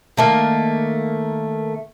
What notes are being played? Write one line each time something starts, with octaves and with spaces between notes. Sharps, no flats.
D#3 A3 A#3